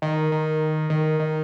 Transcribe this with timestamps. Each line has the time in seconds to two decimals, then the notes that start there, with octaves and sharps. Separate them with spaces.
0.02 D#3
0.32 D#3
0.90 D#3
1.20 D#3